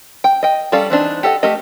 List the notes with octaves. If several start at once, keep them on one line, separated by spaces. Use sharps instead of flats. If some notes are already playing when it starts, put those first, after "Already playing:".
G5
D#5 G5
G3 C#4 A4 D5 F5
E3 C4 D4 D#4
G4 A4 D#5 F#5
A3 G4 A#4 D#5